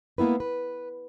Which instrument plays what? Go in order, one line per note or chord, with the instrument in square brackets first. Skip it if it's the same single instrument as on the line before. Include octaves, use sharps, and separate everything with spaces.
[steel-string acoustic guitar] G#3 A#3 B3 E4 B4
B4